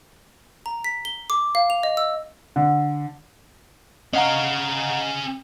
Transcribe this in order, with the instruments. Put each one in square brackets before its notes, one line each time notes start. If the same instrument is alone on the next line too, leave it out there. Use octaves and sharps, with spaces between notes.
[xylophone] A#5
B6
G7
D6
F5
F7
D#5
E6
[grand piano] D3
[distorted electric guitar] C#4 F5 [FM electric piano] D#5 F#5 A#5